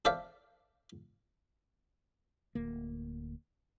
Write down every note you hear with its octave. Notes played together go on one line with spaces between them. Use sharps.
A4 C5 D5 E5 F5
D1 D2 A#3